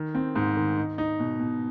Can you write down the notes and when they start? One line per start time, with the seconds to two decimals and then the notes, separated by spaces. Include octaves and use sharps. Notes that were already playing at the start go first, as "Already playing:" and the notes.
Already playing: D#3
0.15 C4
0.36 G#2
0.57 D#3
0.77 D#4
0.98 D#4
1.19 B2
1.39 B2